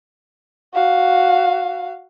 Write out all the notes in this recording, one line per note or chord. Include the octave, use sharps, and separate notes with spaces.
F#4 F5